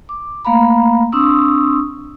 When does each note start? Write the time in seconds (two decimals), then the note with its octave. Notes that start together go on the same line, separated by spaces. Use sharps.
0.09 D6
0.45 A3 A#3 F5 A#5 B5
1.12 C4 D4 C6 C#6 D#6 E6